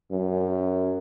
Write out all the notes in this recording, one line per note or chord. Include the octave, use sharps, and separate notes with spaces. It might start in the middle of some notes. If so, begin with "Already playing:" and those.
F#2